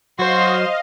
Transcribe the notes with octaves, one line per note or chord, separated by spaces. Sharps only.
F#3 F#4 C5 D#5 F5 C6